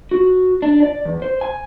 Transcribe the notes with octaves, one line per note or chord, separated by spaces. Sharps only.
F#4
D4
D5
E2
C5
G#5